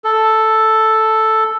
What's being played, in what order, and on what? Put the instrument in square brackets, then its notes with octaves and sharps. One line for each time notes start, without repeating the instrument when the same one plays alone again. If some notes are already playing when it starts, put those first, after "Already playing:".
[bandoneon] A4